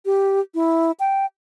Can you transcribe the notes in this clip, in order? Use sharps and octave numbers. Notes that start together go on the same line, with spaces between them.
G4
E4
G5